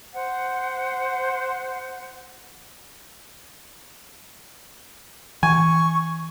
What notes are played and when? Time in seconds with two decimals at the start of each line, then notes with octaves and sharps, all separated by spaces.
0.13 C5 F#5
5.43 E3 G#5 C#6